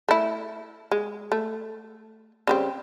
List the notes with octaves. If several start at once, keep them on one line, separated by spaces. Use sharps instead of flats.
A3 E4
G#3
A3
C#3 G3 C4